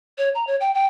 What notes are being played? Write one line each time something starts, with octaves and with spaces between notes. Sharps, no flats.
C#5
A#5
C#5
G5
G5